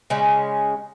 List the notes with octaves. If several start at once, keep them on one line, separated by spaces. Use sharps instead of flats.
C#3 G#3 C#4